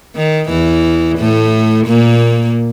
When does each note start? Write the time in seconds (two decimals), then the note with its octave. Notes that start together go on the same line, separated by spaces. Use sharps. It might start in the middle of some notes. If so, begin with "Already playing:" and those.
0.16 D#3
0.49 E2 E3
1.18 A2 A3
1.86 A#2 A#3